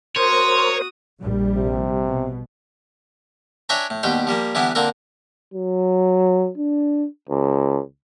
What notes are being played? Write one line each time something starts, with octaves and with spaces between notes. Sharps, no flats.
F#4 A#4 C5 C#5 C6 D#6
A#1 G3
C3
B2
D4 C#5 E5 G5 G#5 A#5
A2
D#2 B2 G3 C5 G5
F3 G3 A#3
D3 E3 G3 B3 E4
D3 A#3 C4 A4 A#4
F#3
D4
C#2